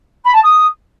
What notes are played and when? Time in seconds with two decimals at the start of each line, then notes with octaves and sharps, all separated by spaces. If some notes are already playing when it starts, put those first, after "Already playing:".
0.24 B5
0.33 A5
0.43 D#6